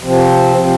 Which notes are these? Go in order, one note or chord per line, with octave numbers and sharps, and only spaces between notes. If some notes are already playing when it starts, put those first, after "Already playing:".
C3 F3 C4
C3 F3 C4